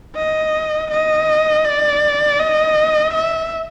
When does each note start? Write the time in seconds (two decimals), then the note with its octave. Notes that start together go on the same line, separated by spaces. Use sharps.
0.16 D#5
0.91 D#5
1.65 D5
2.39 D#5
3.14 E5